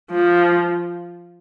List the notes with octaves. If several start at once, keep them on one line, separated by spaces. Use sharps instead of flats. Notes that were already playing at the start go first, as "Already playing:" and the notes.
F3